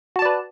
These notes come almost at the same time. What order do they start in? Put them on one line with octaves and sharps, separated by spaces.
F#4 A5 D5 B4